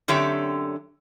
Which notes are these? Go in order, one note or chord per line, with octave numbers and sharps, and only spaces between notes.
F#2 D3 C4 G4 C#5 E5